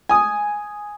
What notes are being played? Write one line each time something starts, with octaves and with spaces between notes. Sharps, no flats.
G#5 D#6